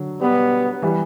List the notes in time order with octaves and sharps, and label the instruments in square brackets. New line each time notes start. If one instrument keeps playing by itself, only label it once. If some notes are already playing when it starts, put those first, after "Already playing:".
Already playing: [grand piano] D3 F#3
[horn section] B2 G3 B3
[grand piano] E3 G3